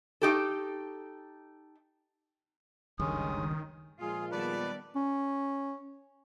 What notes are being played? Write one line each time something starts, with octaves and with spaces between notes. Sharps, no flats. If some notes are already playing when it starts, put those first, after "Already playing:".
D#4 G4 A4
F#1 C#2 G2 D#3 G#3 C#4 D#6
A#2 F3 G#3 F4 G#4
D#3 G3 B3 B4 D5 A5
C#4